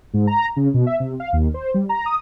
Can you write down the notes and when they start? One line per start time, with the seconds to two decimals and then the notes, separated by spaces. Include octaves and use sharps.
0.14 G#2
0.27 A#5
0.56 C#3
0.74 B2
0.87 E5
1.00 C3
1.20 F5
1.33 D#2
1.54 C5
1.74 G3
1.89 A#5
2.06 D#6